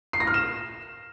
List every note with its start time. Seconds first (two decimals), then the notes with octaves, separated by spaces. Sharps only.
0.13 C7
0.20 A#6
0.27 F6
0.34 E7